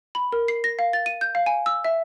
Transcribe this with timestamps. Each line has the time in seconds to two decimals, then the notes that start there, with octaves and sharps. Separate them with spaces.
0.15 B5
0.32 A#4
0.48 C7
0.64 A#6
0.79 F5
0.93 A6
1.06 D#7
1.21 G6
1.35 F5
1.46 G#5
1.66 E6
1.85 E5